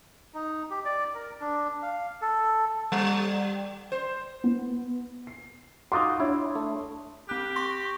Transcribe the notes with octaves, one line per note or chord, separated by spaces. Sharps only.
D#4
G4
D5
A#4
D4
F5
A4
G3
C5
B3
C7
D#4 F4 F#4 C6 D6 D#6
D4 E4 C#5
A3
C4 G4 F#6
C6 C#6 A#6